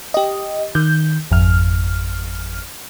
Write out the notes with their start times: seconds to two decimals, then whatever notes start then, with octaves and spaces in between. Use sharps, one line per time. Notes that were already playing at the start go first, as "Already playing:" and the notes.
0.14 G4 D#5
0.75 D#3 G6
1.31 G#1 F2 F6